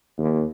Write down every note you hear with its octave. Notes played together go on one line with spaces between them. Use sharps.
D#2